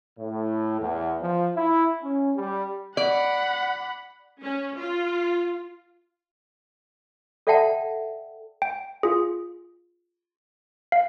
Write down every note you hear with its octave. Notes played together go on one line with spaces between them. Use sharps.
A2
E2
F3
E4
C#4
G3
D5 F#5 B5
C#4
F4
A4 D5 E5 F#5 G5 A5
G5
F4 G#4
F5